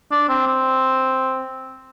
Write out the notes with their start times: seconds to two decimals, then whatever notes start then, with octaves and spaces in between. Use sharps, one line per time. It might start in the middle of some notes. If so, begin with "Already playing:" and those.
0.11 D4
0.29 C4
0.47 C4